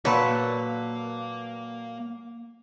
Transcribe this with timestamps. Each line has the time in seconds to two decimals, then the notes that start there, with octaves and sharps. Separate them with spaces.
0.05 A#2 F#3 A#3 A4 B4 C#5 F5